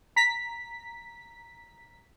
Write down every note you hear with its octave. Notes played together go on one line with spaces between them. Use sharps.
A#5 B6